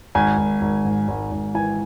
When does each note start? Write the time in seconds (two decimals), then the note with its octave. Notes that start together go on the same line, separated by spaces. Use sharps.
0.15 G#1 G#5
0.38 G#1
0.61 G#1
0.85 G#2
1.08 G#1
1.32 G#1
1.54 E3 G#5